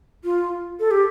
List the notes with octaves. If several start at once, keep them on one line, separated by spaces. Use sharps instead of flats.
F4
A4
G4